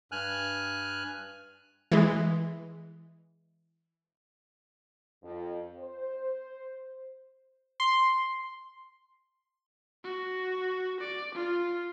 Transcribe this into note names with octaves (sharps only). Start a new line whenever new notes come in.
G2 G#5 F6 F#6
E3 G#3
F2
C5
C6
F#4
D5
F4